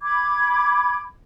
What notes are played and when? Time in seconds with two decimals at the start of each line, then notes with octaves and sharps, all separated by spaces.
0.02 B5 D6 G#6